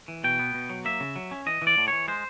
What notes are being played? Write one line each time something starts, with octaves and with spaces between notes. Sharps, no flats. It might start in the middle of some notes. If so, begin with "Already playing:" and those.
E3
B2 G5
B3
B2
F#3
A#3 E5
C#3
F#3
C#4
E3 D#5
E3
D5
A2
E3 C#5
G#3 C5